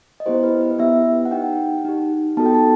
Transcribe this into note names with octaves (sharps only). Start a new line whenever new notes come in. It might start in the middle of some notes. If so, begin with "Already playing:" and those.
D#5
B3 E4 G4 C5
B4
B4
B3 E4 G4 E5
F#5
D#4 G4 G5
D#4 G4
B3 D#4 F#4 A4 A5
G5
A5